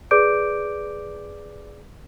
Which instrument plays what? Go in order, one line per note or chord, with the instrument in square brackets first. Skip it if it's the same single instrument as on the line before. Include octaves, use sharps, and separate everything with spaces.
[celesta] G#4 B4 D5 D6 G6 D7